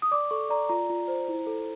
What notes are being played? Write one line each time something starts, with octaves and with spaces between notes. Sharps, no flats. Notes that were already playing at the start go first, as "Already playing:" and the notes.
D#6
D5 D6
A4 C#6
D5 A#5
F4 A#5
F4
C5
E4
A4